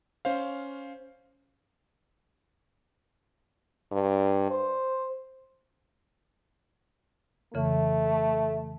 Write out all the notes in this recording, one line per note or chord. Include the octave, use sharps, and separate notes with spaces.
C#4 C5 F5
G2
C5
F2 C#3 E3 A3